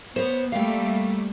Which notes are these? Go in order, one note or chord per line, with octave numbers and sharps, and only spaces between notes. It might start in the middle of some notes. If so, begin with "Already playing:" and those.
B3 C5 C#5
G3 A3 A#3 F5 G5